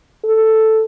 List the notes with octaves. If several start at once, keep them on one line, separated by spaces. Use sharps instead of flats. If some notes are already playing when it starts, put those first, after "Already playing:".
A4